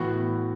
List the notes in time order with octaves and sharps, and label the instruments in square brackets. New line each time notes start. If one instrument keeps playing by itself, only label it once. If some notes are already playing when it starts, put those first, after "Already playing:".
Already playing: [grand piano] A2 E3 B3 F#4